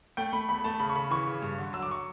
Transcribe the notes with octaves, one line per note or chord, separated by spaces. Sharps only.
A3 G5
A3 B5
E2 B5
A3 A5
C#3 B5
C#6
C#3 B5
E3 C#6
C#3
G2
D3
F#3 E6
D6
C#6